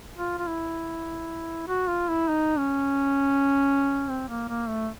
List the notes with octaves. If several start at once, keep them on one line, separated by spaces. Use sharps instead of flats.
F4
F4
E4
F#4
F4
E4
D#4
C#4
C4
A#3
A#3
A3